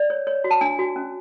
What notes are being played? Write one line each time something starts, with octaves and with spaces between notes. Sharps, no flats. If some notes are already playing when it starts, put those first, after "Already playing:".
Already playing: D5
C#5
C#5
F#4
A5
D4 G#5
F#4
C#4